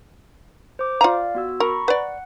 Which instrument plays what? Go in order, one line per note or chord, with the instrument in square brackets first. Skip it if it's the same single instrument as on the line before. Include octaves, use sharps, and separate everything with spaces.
[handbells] C5 D6
[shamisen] F4 A#5 [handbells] D5 F5
[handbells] B3 F#4 E6
[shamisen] A#4 [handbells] A#5 B5 C#6
[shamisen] B4 D5 [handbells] F#5